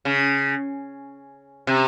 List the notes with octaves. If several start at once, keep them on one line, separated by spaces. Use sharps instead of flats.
C#3
C3